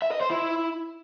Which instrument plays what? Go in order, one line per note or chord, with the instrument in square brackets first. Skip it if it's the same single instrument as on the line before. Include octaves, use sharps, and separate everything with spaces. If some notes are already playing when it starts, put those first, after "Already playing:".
[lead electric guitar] E5
D#5
C5
E4